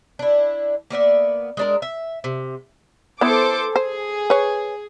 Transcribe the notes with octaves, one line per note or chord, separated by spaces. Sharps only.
D4 E4
A#3 B3 D5 E5
G#3 D4 A#4
E5
C3
B3 E4 A4 C5 D6
G#4 C5
B4 C#5